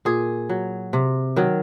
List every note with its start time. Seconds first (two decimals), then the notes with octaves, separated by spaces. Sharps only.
0.05 A#2 G#4
0.50 F#3
0.93 C3
1.36 D#3 F#3